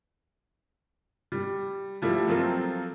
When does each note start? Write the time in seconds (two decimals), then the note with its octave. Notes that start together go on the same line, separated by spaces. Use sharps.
1.32 G3
2.02 F3 G3 A3 E4
2.27 F3 F#3 A#3 C4 F4 A4